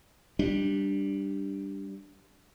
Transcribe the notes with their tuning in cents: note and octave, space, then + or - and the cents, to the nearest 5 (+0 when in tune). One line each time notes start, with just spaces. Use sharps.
G3 +0 D4 +0